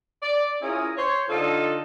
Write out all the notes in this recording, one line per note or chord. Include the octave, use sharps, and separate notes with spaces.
D5
C#4 E4 F4 G#4 A#4
C5 C#5
D3 D#4 F4 A4